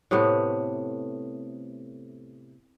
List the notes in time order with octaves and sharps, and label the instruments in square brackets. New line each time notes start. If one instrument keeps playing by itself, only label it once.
[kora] A2 C3 A3 B3